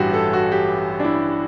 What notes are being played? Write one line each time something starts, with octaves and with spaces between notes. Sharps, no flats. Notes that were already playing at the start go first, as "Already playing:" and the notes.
Already playing: A1 G2 E3 F#4 G4
A4
F#4
G4
D4
E4